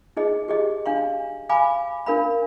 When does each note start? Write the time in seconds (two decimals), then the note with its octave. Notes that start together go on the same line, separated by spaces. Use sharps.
0.17 D#4 G#4 D#5
0.48 G4 G#4 D#5
0.86 D4 F5 C6
1.49 F5 G#5 B5 D6
2.06 D4 A#4 F5 B5